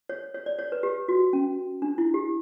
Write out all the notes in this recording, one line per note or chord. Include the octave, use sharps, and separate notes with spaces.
C#5
C#5
D5
C#5
B4
G4
F#4
C#4
D4
E4
G4